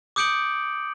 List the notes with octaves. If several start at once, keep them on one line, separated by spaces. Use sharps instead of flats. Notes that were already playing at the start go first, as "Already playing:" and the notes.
D6 D#6 G6 C#7 D7 F#7